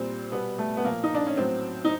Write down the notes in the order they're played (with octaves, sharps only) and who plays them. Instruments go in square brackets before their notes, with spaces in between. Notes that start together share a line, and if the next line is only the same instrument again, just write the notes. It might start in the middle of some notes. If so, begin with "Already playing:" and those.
Already playing: [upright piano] A#2 G3 C4
B2 G3 B3
A3
B3
A#2 F3 A#3
D#4
D4
C#4
A2 F#3 C4
D#4